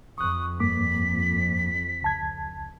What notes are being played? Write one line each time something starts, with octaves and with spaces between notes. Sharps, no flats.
F2 C#6 D#6 F#6
G2 A#3 D6 B6
C#2 A5 G#6